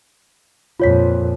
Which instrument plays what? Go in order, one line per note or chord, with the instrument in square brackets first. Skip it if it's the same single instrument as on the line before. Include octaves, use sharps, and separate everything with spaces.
[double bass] F2 A#2 [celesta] F4 C#5 B6